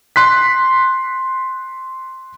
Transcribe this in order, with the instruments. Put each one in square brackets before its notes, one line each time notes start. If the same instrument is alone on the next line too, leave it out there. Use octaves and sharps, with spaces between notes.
[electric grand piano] C6 F#6 B6